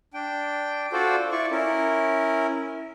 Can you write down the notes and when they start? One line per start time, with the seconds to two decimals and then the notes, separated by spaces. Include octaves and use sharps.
0.14 D4 G5
0.93 F4 F#4 A4 C5 D5
1.31 E4 F4 D5 C#6
1.51 C#4 E4 A#4